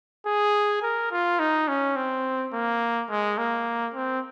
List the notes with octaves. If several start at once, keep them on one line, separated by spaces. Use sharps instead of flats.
G#4
A#4
F4
D#4
C#4
C4
A#3
G#3
A#3
C4